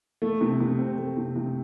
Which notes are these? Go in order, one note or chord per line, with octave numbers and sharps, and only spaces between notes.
A3
C3
C3
C4
A3
C3
C3